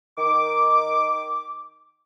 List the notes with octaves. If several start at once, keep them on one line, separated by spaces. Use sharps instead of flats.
D#3 D6